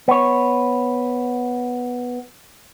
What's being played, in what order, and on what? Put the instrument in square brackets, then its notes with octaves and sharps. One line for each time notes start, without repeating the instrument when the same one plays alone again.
[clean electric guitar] B3 C#5